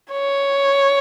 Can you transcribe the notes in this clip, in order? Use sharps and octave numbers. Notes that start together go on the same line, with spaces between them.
C#5